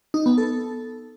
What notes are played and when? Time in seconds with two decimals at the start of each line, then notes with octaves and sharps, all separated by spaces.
0.14 D#4
0.26 B3
0.38 A4